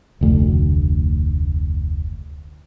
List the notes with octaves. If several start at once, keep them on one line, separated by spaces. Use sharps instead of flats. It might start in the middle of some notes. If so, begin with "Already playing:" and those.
F1 D2